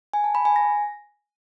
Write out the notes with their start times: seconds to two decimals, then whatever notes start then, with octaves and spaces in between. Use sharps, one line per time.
0.13 G#5
0.24 A5
0.35 B5
0.45 G#5
0.56 A#6